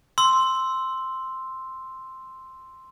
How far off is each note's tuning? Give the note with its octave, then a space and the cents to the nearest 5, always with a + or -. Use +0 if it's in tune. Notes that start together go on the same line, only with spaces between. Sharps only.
C6 +0 E6 +0